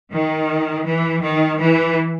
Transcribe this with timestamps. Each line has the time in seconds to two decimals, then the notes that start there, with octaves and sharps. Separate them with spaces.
0.11 D#3
0.85 E3
1.22 D#3
1.59 E3